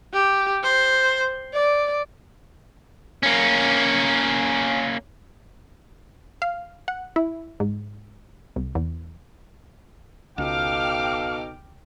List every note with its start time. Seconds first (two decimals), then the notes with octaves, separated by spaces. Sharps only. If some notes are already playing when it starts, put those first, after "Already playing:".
0.14 G4
0.64 C5
1.54 D5
3.23 A#3 C#4
6.42 F5
6.88 F#5
7.16 E4
7.60 G#2
8.56 C2
8.75 E2
10.38 C#2 B2 D#4 A4 F5 G5 D6 F6